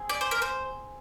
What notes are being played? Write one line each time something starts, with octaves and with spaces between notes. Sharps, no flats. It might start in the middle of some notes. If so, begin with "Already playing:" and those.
Already playing: C4 G#4
D5
C5
A#4
C5